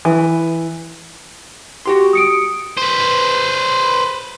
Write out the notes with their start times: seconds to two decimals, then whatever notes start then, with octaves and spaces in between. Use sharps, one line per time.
0.05 E3
1.86 F#4 G4 C6
2.13 D#6 C#7 D7
2.77 B4 C5